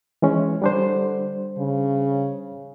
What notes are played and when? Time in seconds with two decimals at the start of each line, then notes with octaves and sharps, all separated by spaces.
0.22 E3 G#3 C#4
0.62 D3 G3 D4 C5
1.58 C#3